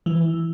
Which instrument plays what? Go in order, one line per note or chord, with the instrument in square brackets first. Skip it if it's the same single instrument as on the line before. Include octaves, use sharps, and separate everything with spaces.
[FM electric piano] E3